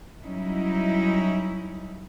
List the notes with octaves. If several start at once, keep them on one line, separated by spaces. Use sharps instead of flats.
F#3 G3 C#4 D#4 E4